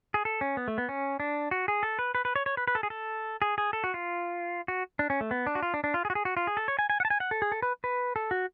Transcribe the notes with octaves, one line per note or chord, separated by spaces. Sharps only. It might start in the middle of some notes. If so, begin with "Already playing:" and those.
G#4
A4
C#4
B3
A3
B3
C#4
D4
F#4
G#4
A4
B4
B4
B4
C#5
C#5
B4
B4
A4
G#4
A4
G#4
G#4
A4
F#4
F4
F#4
D4
C#4
A3
B3
D4
F#4
F4
D4
D4
F4
G#4
F#4
G#4
F#4
F4
G#4
A4
C#5
G#5
G#5
F#5
A5
G#5
F#5
A4
G#4
A4
B4
B4
A4
F#4